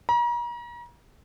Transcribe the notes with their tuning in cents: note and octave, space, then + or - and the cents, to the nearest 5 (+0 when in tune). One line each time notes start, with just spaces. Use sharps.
A#5 +40